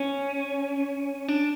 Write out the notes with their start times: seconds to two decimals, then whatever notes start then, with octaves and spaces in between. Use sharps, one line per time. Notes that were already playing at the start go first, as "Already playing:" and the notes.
Already playing: C#4
1.28 D4